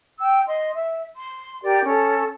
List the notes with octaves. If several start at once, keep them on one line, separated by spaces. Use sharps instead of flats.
G5 E6
D#5 C6
E5
C6
G4 A#4 D5
C#4 A4